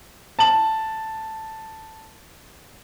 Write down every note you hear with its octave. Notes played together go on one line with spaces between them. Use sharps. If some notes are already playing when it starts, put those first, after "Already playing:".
A5 F#7